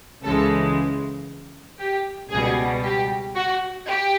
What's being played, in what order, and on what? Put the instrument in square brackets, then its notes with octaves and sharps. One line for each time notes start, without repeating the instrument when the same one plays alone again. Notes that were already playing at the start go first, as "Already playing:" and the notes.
[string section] C#2 C#3 E3 G#3 A4
G4
C#2 B2 G3 G#4
G4
F#4
G4